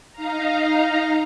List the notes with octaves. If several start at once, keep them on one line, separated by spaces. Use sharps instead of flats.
D#4 F5 A#5